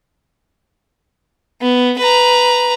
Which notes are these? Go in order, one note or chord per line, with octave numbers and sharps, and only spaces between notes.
B3
B4 A#5